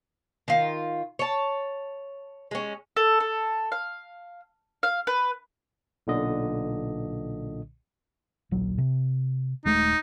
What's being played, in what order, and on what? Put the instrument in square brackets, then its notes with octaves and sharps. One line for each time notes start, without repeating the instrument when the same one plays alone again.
[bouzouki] D#3 F4
C#5 A5
G#3 C#4
[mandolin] A4
A4
F5
F5
B4
[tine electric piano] B1 A#2 D3 D#5
[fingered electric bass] D1 A#1 F#3
C3
[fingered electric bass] D#1 G#3 A3 [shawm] D#4